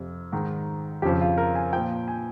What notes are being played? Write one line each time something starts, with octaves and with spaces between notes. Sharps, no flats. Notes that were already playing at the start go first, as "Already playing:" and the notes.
Already playing: F2 C3 F3
G#2 D#3
F2 C#3 F3 G4
F4
A#4
G#5
A#2 F3 G5
G#5